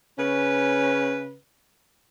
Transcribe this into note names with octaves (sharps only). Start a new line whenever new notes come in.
C#3 C#4 B4